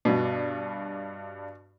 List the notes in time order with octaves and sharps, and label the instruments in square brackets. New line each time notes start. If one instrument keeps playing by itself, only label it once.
[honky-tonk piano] G2 D4 [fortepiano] B2